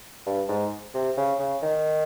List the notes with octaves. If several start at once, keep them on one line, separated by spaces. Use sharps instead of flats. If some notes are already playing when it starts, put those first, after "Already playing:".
G2
G#2
C3
C#3
C#3
D#3